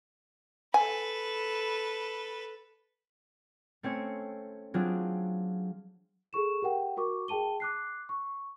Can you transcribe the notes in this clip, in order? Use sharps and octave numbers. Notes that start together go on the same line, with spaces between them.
A4 B4 G#5
A3 C4 C#4 C#5
F#3 C4 D4 F4 G#4
G#4 A4 C#6 E7
G4 A#4 F#5 G5
F#4 A#4 C#6 D6
G#4 G5 A5 D#7 G7
D6 F#6 C7
C#6